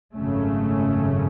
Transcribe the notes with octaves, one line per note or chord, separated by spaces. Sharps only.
G#1 F#2 C#3 A3 C#4